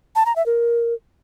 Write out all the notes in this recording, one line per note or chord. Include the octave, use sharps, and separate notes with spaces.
A5
A#5
E5
A#4